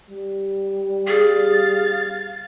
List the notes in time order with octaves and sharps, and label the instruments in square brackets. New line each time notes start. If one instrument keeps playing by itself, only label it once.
[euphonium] G3
[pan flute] G#4 [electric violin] F5 A6